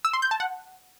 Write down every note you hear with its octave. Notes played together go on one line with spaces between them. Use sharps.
E6
C6
G6
A5
F#5